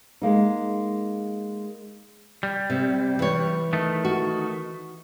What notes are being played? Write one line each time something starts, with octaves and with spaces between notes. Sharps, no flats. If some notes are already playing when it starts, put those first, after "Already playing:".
G#3 A#3 D#4
G3
C3
E3 C#5
D#3 A3
F#4